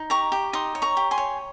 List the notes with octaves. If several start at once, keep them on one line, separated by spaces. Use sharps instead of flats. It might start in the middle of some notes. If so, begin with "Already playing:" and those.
Already playing: D#4
G4 A#5 C#6
G4
D#4 C6 D#6
C#5
A#5 C#6
G4
G#5 C6
C#5